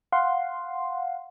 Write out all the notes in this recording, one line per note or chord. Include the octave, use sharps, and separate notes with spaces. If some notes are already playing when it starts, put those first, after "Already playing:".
F5 F#5 C6